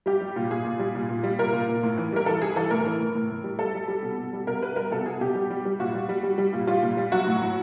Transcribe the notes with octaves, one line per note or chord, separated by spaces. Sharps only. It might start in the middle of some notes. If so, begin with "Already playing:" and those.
G3 G4
G3
A#2
A#2 G#4
A#2
G3
A#2
A#2
G3
A#2 A#4
A#2
A#2
A2
E3
G3 A#4
E3 A4
G3 G#4
E3 A4
A2 A#4
E3
A2
A2
A2
G3
G3 A4
G3
G3
B2
B2
G3
B2 A#4
G3 B4
G3 A#4
B2 A4
B2 G#4
B2 G4
G3
G3
G3
A#2 F#4
G3
G3
G3
G3
A#2
G3 F4
A#2
G3
F#3 F#4
A2
A2